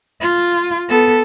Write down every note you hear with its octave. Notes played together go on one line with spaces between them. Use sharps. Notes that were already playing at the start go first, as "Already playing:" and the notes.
F4
B3 A4